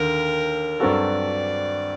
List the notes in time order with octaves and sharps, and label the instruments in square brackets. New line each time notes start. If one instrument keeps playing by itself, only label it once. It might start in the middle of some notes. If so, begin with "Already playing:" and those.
Already playing: [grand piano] D#2 D3 [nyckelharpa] A#4
[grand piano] G2 F#3 C4 F#4 A4 [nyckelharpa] D5